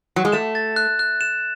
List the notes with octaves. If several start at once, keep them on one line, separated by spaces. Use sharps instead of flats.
F#3
G#3
A3 E7
A6
F#6
F#6
E7